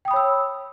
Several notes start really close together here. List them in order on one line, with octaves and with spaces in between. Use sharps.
G5 D#6 B5 C#5 E6